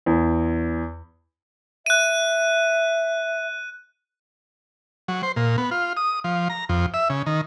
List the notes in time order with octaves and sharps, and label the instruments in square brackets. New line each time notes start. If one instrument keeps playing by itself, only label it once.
[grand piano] E2
[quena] E5 [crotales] F#6 D#7
[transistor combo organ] F#3
C5
A#2
B3
F4
D#6
F3
A#5
F2
E5
C#3
D#3